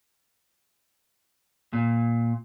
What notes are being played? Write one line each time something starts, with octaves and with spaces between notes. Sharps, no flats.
A#2